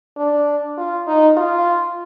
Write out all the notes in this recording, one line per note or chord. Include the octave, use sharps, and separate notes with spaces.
D4
F4
D#4
F4